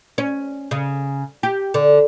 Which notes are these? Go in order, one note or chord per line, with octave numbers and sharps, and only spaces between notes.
C#4
C#3
G4
D3